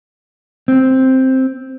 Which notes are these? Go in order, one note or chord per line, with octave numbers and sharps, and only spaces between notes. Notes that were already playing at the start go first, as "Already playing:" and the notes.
C4